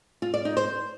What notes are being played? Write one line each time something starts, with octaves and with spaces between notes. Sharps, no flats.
F4
D5
D#4
C5